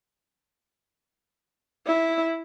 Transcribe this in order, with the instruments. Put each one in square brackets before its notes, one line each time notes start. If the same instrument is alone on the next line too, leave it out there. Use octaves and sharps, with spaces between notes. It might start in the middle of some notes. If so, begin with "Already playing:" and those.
[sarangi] E4